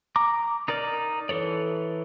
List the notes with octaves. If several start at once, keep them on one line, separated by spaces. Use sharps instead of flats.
A#5 D6
D#4 A#4 D5 F6
E3 A4 C#5 D5